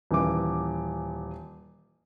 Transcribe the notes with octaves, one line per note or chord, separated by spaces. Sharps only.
D#1 E3 D6